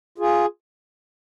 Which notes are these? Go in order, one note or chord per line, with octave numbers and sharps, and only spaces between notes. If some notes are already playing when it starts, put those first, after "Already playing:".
F4 G#4